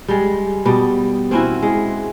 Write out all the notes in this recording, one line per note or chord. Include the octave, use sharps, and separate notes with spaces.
G3 G#3
B2 G3 B3
C4 C#4 E4 F#4
G#3